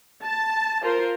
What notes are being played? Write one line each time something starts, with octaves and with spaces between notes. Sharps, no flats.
A5
F4 A#4 C5